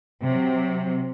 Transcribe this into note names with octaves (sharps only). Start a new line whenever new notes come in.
C3 F#3